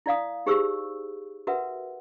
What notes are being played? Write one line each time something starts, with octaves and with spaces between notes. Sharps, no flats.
E4 D5 F5 D#6
D#4 G4 G#4 C5 C#6 E6
F#4 A#4 B4 E5 F#5